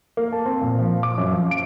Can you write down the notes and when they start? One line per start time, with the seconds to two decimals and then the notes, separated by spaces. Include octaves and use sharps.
0.17 A#3
0.33 A5
0.46 C4
0.61 A#2
0.79 F3
1.03 D6
1.18 F#2
1.32 F3
1.51 D7